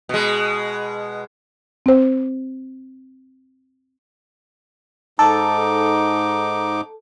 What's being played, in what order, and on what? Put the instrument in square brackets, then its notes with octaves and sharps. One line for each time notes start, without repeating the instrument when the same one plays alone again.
[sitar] B2 G#3
[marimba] C4 C5
[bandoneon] G#2 D#4 D6 [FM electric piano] A4